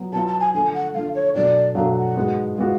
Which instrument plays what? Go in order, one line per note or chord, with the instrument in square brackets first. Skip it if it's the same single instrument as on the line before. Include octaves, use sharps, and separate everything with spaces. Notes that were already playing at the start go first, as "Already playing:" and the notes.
Already playing: [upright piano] F#3 B3 F4
[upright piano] F#3 B3 F4 [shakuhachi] A5
[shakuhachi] A5
G#5
[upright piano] D3 F3 A3 [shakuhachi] G#5
[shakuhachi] F#5
[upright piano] D3 F3 A3 [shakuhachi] F5
[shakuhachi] C#5
[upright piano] B2 F#3 A3 D4 [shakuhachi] D5
[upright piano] B2 F#3 A3 D4 [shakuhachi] F5
[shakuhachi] F#5
[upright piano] G#2 G#3 B3 F#4
[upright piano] G#3 B3 F#4 [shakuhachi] F5